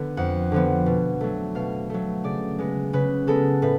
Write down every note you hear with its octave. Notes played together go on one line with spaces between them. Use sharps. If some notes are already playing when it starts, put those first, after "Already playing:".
Already playing: D3 B3
F2 F#5
D3 F3 B3
B2
F#3 A3
B2 F5
F#3 A3
C#3 D5
G#3 B3
C#3 B4
G#3 B3 A4
A2 B4